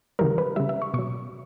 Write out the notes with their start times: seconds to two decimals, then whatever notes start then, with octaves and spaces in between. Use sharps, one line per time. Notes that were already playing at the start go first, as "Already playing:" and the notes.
0.19 C#3 E3 G3 A#4
0.38 B4
0.56 C#3 G3 E5
0.69 E5
0.82 C#6
0.94 B2 F#3 C#6